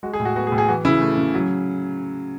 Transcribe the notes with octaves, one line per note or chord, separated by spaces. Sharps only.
G#3 F#4
G#4
A2
F#4
B3 F#4
G#4
A2
G#4
E3 F#4
C#3 E4
A3
C#3
F#3